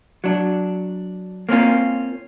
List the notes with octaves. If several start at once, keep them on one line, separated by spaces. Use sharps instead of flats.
F#3 D4
A#3 C4 C#4 F4